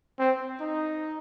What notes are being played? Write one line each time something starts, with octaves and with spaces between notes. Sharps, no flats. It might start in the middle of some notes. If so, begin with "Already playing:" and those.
C4
D#4